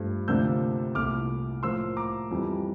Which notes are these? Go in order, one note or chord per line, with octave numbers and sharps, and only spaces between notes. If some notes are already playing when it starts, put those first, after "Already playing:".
Already playing: G2 F3 A3
D2 C3 F3 A#3 D4 E6 G6
C2 A#2 A3 E4 D6 F6
A2 F3 A#3 C6 E6
A#5 D6
F2 E3 G3